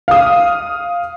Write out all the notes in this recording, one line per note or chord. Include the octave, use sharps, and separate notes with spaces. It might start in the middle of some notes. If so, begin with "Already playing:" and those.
F5 D#6